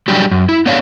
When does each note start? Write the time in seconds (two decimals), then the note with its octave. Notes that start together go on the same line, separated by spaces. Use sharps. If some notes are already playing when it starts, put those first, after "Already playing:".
0.08 F#3 G3 D4 G4 G#4
0.31 F#2
0.49 E4
0.66 B3 D4 C#5 F5